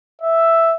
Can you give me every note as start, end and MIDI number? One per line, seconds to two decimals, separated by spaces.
0.21 0.75 76